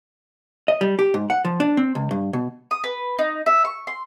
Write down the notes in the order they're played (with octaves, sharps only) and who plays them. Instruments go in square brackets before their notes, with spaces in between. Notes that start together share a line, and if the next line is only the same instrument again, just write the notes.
[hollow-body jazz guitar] D#5
G3
G4
G#2
F#5
F3
D4
C4
C#2
G2
B2
[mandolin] D#6
B4
D#4
E5
C#6
C6